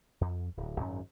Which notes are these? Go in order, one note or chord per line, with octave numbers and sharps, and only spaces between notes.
F2
D1
G#1 F#2 C#4